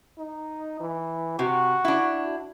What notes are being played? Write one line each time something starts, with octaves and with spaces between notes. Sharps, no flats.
D#4
E3
C3 F#4
D4 E4